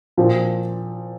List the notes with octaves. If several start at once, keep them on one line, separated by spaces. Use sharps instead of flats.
A#2 F3 C4